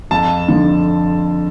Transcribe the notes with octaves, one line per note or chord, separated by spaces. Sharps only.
F2 A5
D3 F3